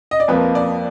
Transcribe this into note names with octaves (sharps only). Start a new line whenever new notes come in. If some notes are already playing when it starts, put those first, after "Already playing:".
D#5
D5
F2 F3 A#3 B4
D5